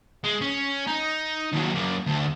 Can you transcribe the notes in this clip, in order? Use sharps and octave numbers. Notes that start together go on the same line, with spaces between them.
G#3
C#4
D#4
D#2 F#3
F#2 A#3
D2